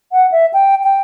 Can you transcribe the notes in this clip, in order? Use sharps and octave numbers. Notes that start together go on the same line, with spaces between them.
F#5
E5
G5
G5